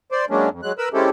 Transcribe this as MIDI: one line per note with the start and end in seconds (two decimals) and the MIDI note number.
0.12 0.25 72
0.12 0.25 74
0.30 0.49 54
0.30 0.49 56
0.30 0.49 58
0.30 0.49 61
0.30 0.49 62
0.50 0.61 41
0.63 0.72 54
0.63 0.72 56
0.63 0.72 90
0.78 0.89 70
0.78 0.89 71
0.78 0.89 83
0.78 0.89 88
0.93 1.10 56
0.93 1.10 60
0.93 1.10 61
0.93 1.10 64
0.93 1.10 67
0.93 1.10 69